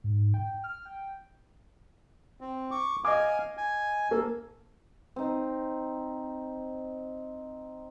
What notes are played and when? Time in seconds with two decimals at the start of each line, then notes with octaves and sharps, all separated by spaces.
0.04 G#2
0.34 G5
0.64 F6
0.85 G5
2.41 C4
2.71 C#6 D6
3.05 D#5 F5 G#5 D6
3.57 G#5
4.11 A#3 A4
5.16 C4 D#4